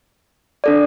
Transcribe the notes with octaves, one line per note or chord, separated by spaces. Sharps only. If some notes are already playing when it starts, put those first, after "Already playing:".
D4 A4 D5